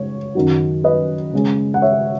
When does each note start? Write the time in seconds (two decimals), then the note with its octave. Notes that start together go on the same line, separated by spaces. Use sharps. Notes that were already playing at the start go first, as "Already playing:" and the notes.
Already playing: C#3 G#3 C#5
0.35 F#2 D#3 F#3
0.84 B4 D#5
1.33 C#3 G#3 C#4
1.74 F#5
1.82 C#5 E5